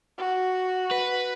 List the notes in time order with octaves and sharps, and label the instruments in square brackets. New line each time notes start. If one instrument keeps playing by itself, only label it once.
[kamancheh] F#4
[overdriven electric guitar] B4